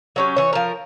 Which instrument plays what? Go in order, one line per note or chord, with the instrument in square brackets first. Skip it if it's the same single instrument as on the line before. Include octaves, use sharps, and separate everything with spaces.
[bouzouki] F#3 C#4 G4
E3 C#5
F3 A#4